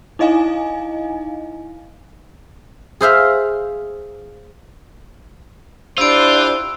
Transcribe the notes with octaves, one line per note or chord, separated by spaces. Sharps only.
D#4 E4 D#5 F5 G#5
G#4 C5 E5 F5
D4 E4 F4 G4 C5 B5 E6 D7